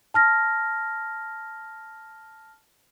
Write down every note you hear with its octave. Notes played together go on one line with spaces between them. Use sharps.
A5 F6 A#6